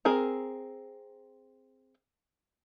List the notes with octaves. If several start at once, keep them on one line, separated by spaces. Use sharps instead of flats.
C4 G#4 A#4 A#5